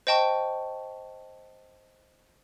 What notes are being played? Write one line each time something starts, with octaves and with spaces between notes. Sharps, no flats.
C5 D#5 G5 A5 C#6